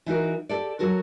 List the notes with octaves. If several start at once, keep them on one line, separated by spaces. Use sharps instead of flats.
E3 D#4 F#4 A#4
G4 A4 D5
F#3 F#4 A4 A#4